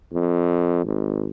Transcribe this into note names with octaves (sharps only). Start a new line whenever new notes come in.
F2
G#1